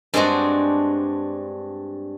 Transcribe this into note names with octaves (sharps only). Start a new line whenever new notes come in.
G2 G#3 C4 D4 F#4